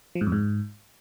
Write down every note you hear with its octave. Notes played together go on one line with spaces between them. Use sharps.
F3
G#2
F2
G#2